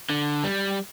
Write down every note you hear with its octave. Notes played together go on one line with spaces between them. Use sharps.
D3
G3